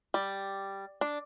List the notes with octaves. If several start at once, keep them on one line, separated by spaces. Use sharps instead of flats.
G3
D4